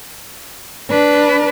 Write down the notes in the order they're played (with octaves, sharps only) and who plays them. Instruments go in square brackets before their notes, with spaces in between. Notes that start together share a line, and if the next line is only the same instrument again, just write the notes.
[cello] D4 B4